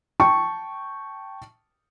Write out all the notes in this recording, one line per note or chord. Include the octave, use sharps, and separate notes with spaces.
G5 A5 C#6